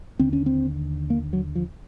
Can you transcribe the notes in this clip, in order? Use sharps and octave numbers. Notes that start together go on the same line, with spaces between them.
D#2 D3 C4
C#4
C4
A#3
F#3
F3